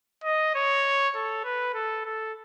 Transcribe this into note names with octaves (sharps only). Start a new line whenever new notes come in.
D#5
C#5
A4
B4
A4
A4